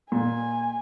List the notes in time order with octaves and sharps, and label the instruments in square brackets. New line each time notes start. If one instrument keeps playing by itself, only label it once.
[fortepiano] A#2 [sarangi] G#5